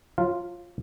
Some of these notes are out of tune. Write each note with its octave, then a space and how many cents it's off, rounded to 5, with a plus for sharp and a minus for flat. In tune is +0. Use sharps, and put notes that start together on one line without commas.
F#3 -40 F4 +0 F5 +5